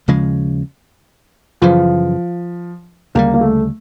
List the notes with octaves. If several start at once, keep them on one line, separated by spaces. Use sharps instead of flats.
D#2 C#3 F3 G#3
F#2 C#3 E3 F3
D2 C#3 E3 G3 A#3
A#3
A3